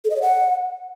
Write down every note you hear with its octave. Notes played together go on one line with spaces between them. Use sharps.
A4
D#5
C#5
F#5